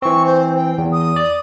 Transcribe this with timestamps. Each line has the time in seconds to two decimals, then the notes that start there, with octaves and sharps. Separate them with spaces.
0.02 E3 C4 C#6
0.26 C5
0.56 G5
0.78 E2
0.93 D#6
1.16 D5